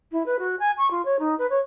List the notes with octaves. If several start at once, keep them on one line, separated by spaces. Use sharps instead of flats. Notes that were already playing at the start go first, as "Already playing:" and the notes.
E4
B4
F#4
G#5
C#6
F4
C#5
D#4
B4
C#5